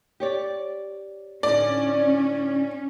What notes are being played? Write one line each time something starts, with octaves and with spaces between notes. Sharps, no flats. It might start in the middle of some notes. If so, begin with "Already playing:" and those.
G4 C#5 D5
A2 D3 C#4 D#4 D5